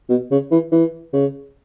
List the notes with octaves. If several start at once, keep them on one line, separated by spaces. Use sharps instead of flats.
B2
C#3
E3
E3
C#3